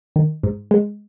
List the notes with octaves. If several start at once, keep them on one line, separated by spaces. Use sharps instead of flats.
D#3
G#2
G#3